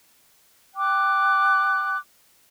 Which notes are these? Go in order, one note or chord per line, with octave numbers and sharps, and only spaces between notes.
G5 D6 F#6